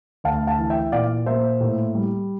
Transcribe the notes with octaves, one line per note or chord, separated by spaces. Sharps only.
D2 F5 A5
F5 A5
E3
E5 G5
A#2 D5 F5
A#3 C5 E5
A2
G3